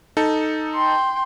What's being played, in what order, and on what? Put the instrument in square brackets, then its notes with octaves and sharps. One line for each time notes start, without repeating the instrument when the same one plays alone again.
[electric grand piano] D#4 A4
[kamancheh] G5 C6